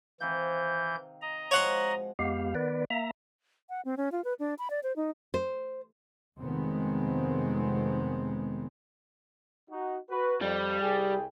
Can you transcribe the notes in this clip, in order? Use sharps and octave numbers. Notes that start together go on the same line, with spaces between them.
C3 D#3 E3 F5 G6
D#5 A#5
F3 G#3 F#4 C#5 F#5 C6
F2 G#3 B3 G4 F5
D#3 B3 B4 D5
A#3 E5 A#5
F#5
C4
C#4
F4
B4
D4
B5
D5
C5
D#4
C5
F1 D#3 G#3 B3 C4
D#4 F#4
F#4 B4
F2 G3
C2 G#4 G5